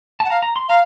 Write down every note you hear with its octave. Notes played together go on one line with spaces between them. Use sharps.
F#5 A5
F5 A#5
A#5
C6
F5 A#5